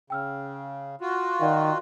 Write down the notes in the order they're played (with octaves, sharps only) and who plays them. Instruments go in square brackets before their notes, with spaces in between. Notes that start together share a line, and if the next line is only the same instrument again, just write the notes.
[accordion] C#3 [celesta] G5 E6 F6
[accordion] F4 F#4
[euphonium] D#3 [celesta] C#5 D5 F5